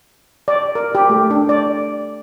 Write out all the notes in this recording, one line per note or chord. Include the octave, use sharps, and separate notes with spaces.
D5
A#4
G4
A3
D4
D5